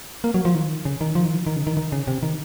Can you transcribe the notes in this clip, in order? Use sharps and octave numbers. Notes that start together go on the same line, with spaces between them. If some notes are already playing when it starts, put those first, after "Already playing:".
A#3
F#3
F3
D#3
C#3
D#3
F3
D#3
F3
D#3
C#3
D#3
D#3
C#3
C3
D#3